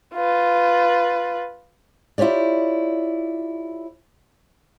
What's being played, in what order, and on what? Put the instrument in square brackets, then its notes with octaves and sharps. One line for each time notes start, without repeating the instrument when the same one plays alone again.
[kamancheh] F4 B4
[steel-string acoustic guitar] E4 F4 G4 C#5 D5